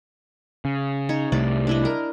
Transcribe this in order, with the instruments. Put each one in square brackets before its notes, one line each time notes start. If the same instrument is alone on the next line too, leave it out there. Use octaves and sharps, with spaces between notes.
[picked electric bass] C#3
[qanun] D#4 C#5
[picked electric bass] C2 C3 A3 [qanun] D5
[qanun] D4 E4 D#5
A#4